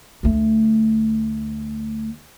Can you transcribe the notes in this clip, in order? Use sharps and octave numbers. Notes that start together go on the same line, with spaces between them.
D2 A3